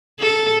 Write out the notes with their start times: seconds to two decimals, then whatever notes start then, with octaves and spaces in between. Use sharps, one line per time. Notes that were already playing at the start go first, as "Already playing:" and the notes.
0.19 A4